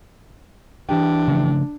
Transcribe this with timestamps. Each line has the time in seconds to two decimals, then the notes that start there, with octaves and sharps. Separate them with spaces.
0.89 E3 D4 G4 G5
1.28 C#3 F3 A3